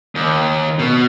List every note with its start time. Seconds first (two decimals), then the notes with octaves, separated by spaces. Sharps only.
0.15 D#2
0.79 B2